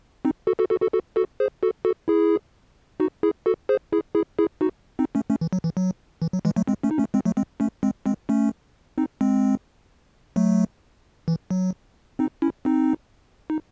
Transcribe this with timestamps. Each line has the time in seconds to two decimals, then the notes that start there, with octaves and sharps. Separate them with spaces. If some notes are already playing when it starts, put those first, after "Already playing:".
0.25 C4 D#4
0.47 F#4 A4
0.59 F#4 A4
0.70 F#4 A4
0.81 F#4 A4
0.93 F#4 A4
1.16 F#4 A4
1.40 G#4 C5
1.63 F#4 A4
1.85 F#4 A4
2.08 E4 G#4
3.00 D#4 F#4
3.23 E4 G#4
3.46 F#4 A4
3.69 G#4 C5
3.92 E4 G#4
4.15 E4 G#4
4.39 E4 G#4
4.61 D#4 F#4
4.99 C4 D#4
5.15 A3 C#4
5.30 A3 C#4
5.41 E3
5.53 F#3
5.64 E3
5.77 F#3
6.22 E3
6.33 F#3
6.45 E3 G#3
6.56 F#3 A3
6.68 G#3 C4
6.83 A3 C#4
6.91 D#4
6.98 A3 C#4
7.14 G#3 C4
7.25 F#3 A3
7.37 G#3 C4
7.60 A3 C#4
7.83 G#3 C4
8.06 G#3 C4
8.29 A3 C#4
8.98 C4 D#4
9.21 G#3 C4
10.36 F#3 A3
11.28 E3
11.51 F#3
12.19 C4 D#4
12.42 C#4 E4
12.65 C4 D#4
13.50 D#4